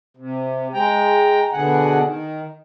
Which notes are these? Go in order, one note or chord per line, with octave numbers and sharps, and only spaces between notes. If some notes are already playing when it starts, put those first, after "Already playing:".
C3
G#3 G5 A#5
B2 D3 G#4 F#5
D#3